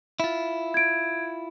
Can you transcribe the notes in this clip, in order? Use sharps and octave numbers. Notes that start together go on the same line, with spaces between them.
E4 F4
G#6 D7